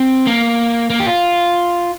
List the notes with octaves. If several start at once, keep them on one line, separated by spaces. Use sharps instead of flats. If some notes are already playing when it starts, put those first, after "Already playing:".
Already playing: C4
A#3
A#3
G4
F4